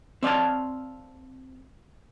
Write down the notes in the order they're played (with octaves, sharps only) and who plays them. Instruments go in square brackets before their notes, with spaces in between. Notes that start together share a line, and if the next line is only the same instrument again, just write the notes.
[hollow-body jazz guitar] C4 D5 F5 A5